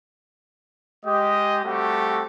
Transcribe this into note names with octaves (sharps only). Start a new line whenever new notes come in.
G#3 G4 D#5
G3 A3 C4 F#4 G4 A4